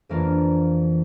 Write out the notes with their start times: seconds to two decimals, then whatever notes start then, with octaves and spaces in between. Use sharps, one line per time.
0.09 F2 E3 A#3 D4 F4